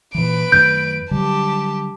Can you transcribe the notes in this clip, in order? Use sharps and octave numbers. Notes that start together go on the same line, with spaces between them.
A#2 E3 B4 D7
F#2 D#3 A3 G6
D3 F#3 G3 G4 A5